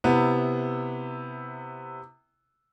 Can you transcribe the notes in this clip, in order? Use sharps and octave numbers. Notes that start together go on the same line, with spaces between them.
C3 B3 E4